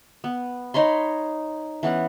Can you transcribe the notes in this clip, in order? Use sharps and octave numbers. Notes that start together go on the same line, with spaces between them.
B3
D#4 C#5 B5 C6
E3 B3 C#4 F#5